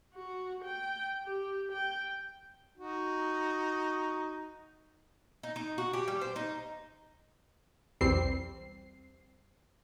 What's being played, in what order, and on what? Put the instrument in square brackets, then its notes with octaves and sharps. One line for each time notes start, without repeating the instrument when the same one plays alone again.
[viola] F#4
G5
G4
G5
[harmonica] D#4 F#4
[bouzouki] D#4
D#4
F#4
G4
G3
C5
D#4
[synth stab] B1 E2 G3 C4 C7